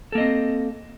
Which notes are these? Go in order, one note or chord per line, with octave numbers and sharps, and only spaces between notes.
A#3 C4 A4 D#5